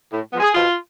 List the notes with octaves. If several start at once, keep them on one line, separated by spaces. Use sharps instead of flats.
A2
F3 G#3 B3
G#4
B2 F4